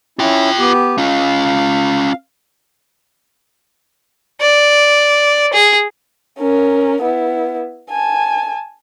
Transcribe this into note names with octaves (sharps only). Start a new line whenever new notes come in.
C#4 E4 F4 G5
B3 G4
C#4 F4 F5
D5
G#4
C#4 A#4
B3 E4
G#5 A5